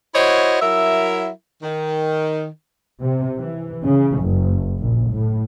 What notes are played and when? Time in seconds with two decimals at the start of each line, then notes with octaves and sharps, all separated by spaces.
0.15 E4 F#4 C5 C#5 D#5
0.62 F#3 E4 A#4 E5
1.63 D#3
3.02 C3
3.38 E3
3.86 C#3
4.20 F#1
4.79 A#1
5.11 A2